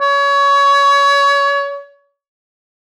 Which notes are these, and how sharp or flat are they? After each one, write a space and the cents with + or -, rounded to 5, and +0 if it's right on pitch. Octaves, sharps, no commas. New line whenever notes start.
C#5 +25